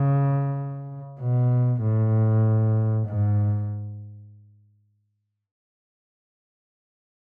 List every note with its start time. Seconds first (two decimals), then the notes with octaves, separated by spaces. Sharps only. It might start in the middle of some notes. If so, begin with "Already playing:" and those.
Already playing: C#3
1.20 B2
1.82 A2
3.07 G#2